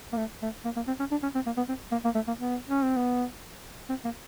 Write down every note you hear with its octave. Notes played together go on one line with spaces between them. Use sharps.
A#3
A3
A3
A#3
A#3
C4
C#4
D4
C#4
C4
A#3
B3
C4
A#3
A#3
A3
A#3
B3
C#4
C4
B3
C4
A#3